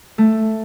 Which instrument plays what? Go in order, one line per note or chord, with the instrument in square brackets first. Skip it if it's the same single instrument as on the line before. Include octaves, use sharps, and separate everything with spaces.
[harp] A3